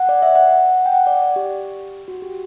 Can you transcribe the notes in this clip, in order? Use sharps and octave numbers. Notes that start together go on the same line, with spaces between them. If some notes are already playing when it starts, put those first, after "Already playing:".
Already playing: F#5
D5
E5
F#5
G5
F#5
D5
D5
G4
F#4
G4